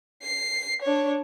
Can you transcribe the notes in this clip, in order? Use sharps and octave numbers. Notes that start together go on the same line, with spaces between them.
C7
D4 C#5